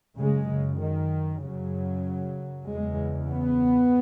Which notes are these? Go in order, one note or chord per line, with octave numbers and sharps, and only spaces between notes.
F#2 C#3 G#3
C#3
D#3
F#2 C#3 F#3
E2 C#3 G#3
B3